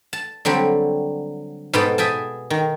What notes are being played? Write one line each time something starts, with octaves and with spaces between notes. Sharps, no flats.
A5
D3 F#3 G3 C4
G#2 B2 B3 A4 G5 A5
G#4 E5 G5 A5
D#3